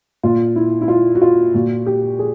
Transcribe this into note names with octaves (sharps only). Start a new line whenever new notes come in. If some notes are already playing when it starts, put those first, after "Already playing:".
A#2 F4
E4
E4
F4
F#4
F4
A#2 F#4
G4
G#4